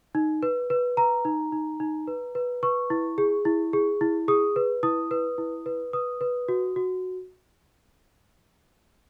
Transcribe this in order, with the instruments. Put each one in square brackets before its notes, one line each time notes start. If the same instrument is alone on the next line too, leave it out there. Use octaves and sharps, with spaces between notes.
[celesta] D#4
B4
B4
B4 A#5
D#4
D#4
D#4
B4
B4
B4 C#6
E4
G#4
E4
G#4
E4
G#4 D#6
B4
E4 D#6
B4
E4
B4
B4 D#6
B4
F#4
F#4